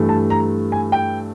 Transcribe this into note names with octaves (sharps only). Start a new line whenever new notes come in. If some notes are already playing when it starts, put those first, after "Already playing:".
Already playing: G2 E3 A3
A5
A#5
G#5
G5